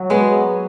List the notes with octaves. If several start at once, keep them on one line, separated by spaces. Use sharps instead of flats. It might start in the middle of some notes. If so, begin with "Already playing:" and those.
Already playing: F#3
G#3 B3